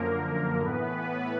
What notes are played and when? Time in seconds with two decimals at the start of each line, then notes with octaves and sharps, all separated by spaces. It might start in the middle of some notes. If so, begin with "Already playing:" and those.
Already playing: F#2 D3 F3 A#3 A#4
0.61 A2 E3 B3 B4